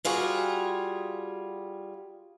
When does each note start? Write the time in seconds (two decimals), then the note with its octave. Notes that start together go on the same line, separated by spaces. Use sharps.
0.05 G3 F4 F#4 G#4